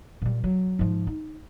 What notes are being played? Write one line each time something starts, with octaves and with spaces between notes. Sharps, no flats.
A#2 G3
F#3
G#2 F3
D#4